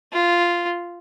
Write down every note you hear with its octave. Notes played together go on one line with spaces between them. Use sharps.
F4